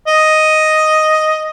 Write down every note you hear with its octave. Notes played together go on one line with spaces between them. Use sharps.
D#5